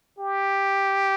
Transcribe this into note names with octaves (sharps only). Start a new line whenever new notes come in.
G4